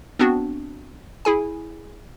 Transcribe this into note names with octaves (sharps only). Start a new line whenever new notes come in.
B3 C4 D4 F#4
E4 G#4 G#5